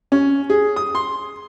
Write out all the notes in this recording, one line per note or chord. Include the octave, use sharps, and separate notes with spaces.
C#4
G#4
D#6
C6